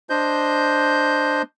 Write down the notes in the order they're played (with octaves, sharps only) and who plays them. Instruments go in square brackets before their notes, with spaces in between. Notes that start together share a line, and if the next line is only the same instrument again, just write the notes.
[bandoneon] D4 C5 D#5 G6